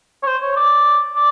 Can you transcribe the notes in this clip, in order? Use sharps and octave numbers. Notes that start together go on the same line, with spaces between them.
C#5
C5
C#5
D5
D5